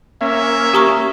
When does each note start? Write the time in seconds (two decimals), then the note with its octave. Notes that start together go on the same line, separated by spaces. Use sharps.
0.21 A#3 C#4 E5
0.74 G4 A#5 C#6